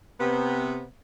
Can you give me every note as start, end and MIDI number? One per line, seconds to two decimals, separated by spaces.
0.20 0.83 48
0.20 0.83 59